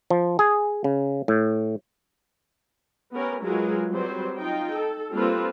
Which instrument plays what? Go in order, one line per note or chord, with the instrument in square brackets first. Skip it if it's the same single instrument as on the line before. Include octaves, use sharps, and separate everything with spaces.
[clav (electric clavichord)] F3
G#4
C#3
A2
[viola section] B3 C#4 G4 A#4
F#3 G#3 F4 G#4 A#4 B4
F#3 G3 C4 B4 C5
D#4 F4 G5
A4
G3 A#3 C4 F4 A4 B4